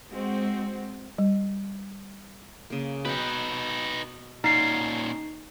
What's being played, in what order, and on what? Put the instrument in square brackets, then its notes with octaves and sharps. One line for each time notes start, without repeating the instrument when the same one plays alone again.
[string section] G#3 C4 F#4
[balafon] G3
[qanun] C#3 A#3
[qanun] B2 G5 [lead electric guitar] D#4 B4
[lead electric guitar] A#2 C#4 [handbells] D#4 C7 [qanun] F#5